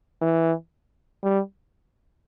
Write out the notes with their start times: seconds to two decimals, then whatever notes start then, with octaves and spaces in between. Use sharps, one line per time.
0.22 E3
1.23 G3